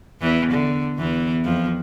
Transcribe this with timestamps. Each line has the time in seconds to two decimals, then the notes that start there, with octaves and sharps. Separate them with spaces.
0.21 E2 E3
0.52 D3
0.99 E2 E3
1.45 F2 F3